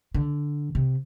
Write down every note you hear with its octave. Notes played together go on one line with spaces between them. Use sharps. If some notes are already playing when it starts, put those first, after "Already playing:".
D3
C3